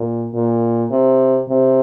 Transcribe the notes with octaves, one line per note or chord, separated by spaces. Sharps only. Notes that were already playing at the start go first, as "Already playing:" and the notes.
Already playing: A#2
A#2
C3
C3